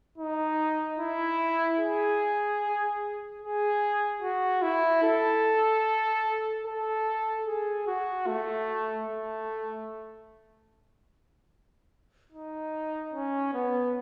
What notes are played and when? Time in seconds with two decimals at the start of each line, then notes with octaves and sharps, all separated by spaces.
0.18 D#4
0.99 E4
1.79 G#4
3.42 G#4
4.22 F#4
4.62 E4
5.03 A4
6.66 A4
7.47 G#4
7.87 F#4
8.27 A3
9.08 A3
12.32 D#4
13.13 C#4
13.54 B3